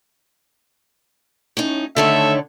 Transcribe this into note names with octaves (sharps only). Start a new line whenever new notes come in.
A2 C#4 D#4
D3 D#3 A3 A4 C#5 E5